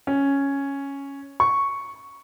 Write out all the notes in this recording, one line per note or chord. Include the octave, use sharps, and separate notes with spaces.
C#4
C#6